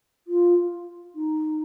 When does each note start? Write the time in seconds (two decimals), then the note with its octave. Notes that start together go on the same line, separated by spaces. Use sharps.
0.28 F4
1.15 D#4